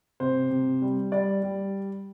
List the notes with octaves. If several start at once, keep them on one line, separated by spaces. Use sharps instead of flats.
C3 C5
C3
G3
G3 D5
G3